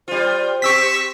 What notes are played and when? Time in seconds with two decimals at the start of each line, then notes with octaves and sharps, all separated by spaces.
0.08 G3 F4 C5
0.62 C4 G4 C#6 E6 B6